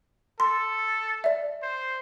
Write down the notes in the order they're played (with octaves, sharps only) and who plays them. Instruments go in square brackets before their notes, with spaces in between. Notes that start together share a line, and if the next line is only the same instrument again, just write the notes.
[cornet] A4 [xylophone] C6
[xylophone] D5 E5
[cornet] C5